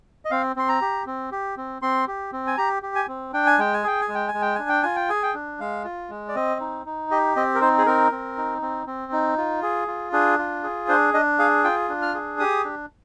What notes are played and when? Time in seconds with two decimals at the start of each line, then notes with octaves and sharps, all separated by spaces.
0.25 D#5
0.31 C4 F5
0.56 C4 C6
0.69 A#5
0.81 G4
1.06 C4
1.32 G4
1.57 C4
1.82 C4 C6
2.08 G4
2.32 C4
2.47 G#5
2.58 G4 A#5
2.83 G4
2.95 G#5
3.08 C4
3.33 D4 G5
3.47 G#5
3.58 G#3 G5
3.74 G#5
3.84 G#4 G5
4.01 G#5
4.09 G#3
4.15 G5
4.28 G#5
4.34 G#3
4.42 G5
4.55 D4 G#5
4.69 G5
4.83 F4 G#5
4.96 G5
5.09 G#4 G#5
5.23 G5
5.34 D4
5.60 G#3 F5
5.85 F4
6.10 G#3
6.29 D5
6.35 C4 D#5
6.61 D#4
6.86 D#4
7.11 G4 D#5
7.36 C4 D#5
7.55 A#4
7.61 D#4 C5
7.78 G#4
7.86 C4 A#4
8.12 C4
8.37 D#4
8.62 C4
8.87 C4
9.12 D#4
9.37 F4
9.63 G#4
9.88 F4
10.13 D4 G#4
10.39 F4
10.63 G#4
10.88 D4 C5
11.14 D4 D#5
11.39 G#4 F5
11.64 F4 G5
11.89 D4
12.02 F6
12.15 G#4
12.39 G4 D#6
12.65 D4